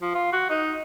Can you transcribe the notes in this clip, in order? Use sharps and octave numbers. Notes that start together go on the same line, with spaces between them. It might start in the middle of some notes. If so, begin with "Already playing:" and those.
F3
F4
F#4
D#4